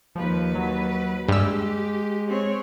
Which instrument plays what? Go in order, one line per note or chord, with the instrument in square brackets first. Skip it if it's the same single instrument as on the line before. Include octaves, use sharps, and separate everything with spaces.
[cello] D#2 B4 [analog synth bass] F3
[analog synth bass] F#3
[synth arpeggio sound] G2 E6 [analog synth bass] G#3 [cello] G4
[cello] C4 C#5